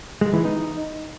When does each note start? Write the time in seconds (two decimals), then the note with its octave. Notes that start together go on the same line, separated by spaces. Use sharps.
0.21 G#3
0.33 E3
0.45 D#4